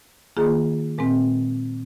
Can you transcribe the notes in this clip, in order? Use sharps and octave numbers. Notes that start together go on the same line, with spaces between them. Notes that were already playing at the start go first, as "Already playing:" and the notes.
D#3 A#3 F4 G#4
A#2 G#3 C4